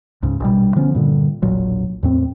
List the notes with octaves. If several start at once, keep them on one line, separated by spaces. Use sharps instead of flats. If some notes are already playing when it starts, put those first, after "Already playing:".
C#2 G#2 C#3
A#1 B2 G3
D3 F3 B3 C#4
G2 A#2 D3
E1 A#1 A#2 F#3
E2 A2 C4